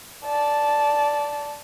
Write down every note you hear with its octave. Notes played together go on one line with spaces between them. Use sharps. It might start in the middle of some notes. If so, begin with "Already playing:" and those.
D5 A5